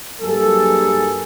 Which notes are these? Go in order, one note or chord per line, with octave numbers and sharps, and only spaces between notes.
G2 F#3 A#3 G#4 A4